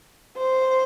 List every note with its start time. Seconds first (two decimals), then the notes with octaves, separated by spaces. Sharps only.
0.37 C5